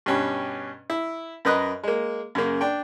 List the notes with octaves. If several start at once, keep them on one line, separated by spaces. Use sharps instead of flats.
G2 B2 C#4 G4
E4
F#2 A#4 B4 D#5 F#6
G#3 A#3
F#2 C#3 A#3
D4 G5